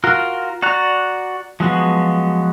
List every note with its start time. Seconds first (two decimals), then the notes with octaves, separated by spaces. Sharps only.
0.04 F4 F#4 A#4
0.62 F#4 D5 A#5 F#6
1.60 F3 F#3 G#3 B3 F#4